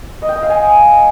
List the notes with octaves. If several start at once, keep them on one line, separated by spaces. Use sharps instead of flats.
D#5
G5
D#5
F5
G#5